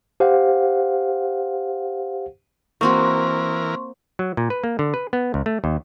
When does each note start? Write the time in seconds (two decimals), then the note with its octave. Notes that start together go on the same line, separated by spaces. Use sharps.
0.20 G4 C5 F5 F#5
2.81 E3 A#3 C4 F#4 A#4 C6 C#6
4.19 F#3
4.37 A#2
4.50 B4
4.64 A#3
4.79 D3
4.94 B4
5.13 B3
5.34 C#2
5.46 A3
5.64 D#2